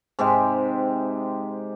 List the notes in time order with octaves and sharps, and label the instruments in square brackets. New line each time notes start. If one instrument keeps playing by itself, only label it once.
[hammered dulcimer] G#2 C3 G#3 G4